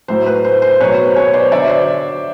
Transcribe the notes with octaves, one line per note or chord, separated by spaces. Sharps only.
A2 F#3 C5
B4
C5
C5
B2 F#3 B4 C#5
C5
B4 C#5
C5 D5
D3 F#3 D5 E5
C5 D5